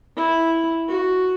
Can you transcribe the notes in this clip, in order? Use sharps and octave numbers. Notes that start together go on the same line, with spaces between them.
E4
F#4